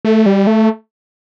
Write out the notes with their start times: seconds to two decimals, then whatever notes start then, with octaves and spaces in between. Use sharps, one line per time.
0.05 A3
0.26 G3
0.47 A3